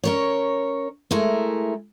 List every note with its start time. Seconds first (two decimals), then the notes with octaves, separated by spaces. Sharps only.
0.04 C#4 A#4 C#5
1.11 G#3 A3 E4 A#4